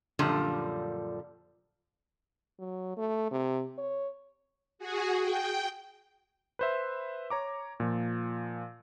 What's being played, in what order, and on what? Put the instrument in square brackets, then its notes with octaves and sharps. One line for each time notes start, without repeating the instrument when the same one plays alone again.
[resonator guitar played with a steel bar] F#2 A#2 D3 F3 G3
[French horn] F#3
A3
C3
C#5
[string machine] F#4 G#4
G5
[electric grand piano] B4 C5 E5
C#5 A#5 D6
A#2 F3